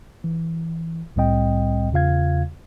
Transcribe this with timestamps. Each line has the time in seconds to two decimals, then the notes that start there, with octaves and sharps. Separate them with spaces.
0.24 E3
1.16 C2 A2 G3 C4 D#5 G5
1.92 E2 C#3 F4 F5 G#6